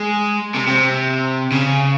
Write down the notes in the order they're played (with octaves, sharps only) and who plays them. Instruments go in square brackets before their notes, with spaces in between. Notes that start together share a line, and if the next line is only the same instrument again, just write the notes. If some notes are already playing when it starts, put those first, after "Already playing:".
Already playing: [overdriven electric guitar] G#3
C3
C3
C#3